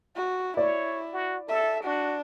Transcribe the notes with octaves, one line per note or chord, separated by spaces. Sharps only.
F#4
E4 C#5 D5
F#4
A4 E5
D4 F#4